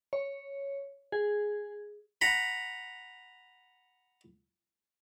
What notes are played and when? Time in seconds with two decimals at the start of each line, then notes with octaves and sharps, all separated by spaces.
0.13 C#5
1.12 G#4
2.21 F#5 A#5 B5